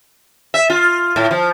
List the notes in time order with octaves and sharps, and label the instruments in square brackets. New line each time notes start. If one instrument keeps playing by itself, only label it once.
[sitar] E5
F4
A2
F3